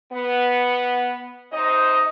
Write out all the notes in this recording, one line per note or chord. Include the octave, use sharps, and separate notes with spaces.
B3
C3 D#4 C5 D#5